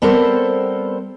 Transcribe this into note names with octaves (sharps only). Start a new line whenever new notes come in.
G3 B3 C4 A4 A#4 C5